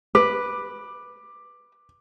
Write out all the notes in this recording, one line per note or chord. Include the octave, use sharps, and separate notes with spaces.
B4 D6